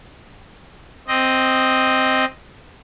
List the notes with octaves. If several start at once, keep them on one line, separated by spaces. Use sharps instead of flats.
C4 D#5